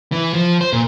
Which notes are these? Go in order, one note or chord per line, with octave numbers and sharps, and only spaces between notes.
E3
F3
C5
A#2